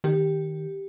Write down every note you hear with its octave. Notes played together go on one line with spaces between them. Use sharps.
D#3 G4